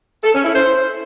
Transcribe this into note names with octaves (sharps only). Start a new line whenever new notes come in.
A4
C#4
E4
C5